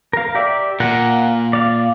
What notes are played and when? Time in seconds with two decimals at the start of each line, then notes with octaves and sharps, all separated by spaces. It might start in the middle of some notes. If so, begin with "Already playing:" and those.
0.13 A#4 F5
0.35 G4 D5 E5
0.80 A#2 F4 A#4 F#5
1.53 D5 F5